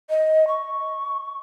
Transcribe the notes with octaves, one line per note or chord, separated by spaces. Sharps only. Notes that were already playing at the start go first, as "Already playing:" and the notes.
D#5
C#6